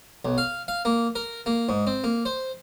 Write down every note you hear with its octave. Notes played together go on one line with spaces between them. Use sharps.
B1
F5
F5
A#3
A#4
A#3
G#2
C4
A#3
C5